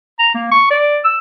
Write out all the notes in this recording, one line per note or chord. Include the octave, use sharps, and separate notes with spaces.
A#5
A#3
C#6
D5
E6